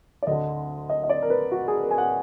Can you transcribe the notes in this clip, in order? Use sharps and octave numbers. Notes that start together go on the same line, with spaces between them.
D5
D2 D3 D#5
D#5
D#5
D5
A#4
B4
F#4
G#4
A#4
G#5
F#5